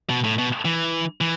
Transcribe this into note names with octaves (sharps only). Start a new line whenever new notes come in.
B2
A2
B2
E3
E3